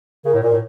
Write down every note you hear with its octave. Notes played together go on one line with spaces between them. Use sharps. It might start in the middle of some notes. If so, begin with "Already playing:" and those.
C#3 A#4
A2
A#2 A#4
A2